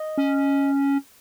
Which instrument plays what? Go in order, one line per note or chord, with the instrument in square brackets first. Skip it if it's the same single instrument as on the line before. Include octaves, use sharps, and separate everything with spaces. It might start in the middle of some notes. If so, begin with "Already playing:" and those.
Already playing: [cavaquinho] D#5
[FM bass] C#4